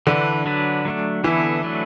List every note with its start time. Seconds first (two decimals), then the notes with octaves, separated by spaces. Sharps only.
0.07 D3 E3 D4 B4
0.46 F#3 D4 B4
0.85 F#3 A3 D4
1.24 D3 E3 B3 E4 A4
1.64 F#3 A3 D4 B4